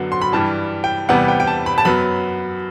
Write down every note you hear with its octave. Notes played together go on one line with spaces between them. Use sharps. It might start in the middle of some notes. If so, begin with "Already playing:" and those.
Already playing: F#2 D3 F#3 B3
C6
B5
G2 E3 G3 A5
G5
E2 C3 G3 B3 F#5
G5
G5
A5
B5
A5
F#2 F#3 B3 B5